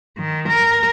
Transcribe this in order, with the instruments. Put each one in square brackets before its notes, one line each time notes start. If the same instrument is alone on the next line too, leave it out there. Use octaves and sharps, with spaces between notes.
[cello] D#3
A#4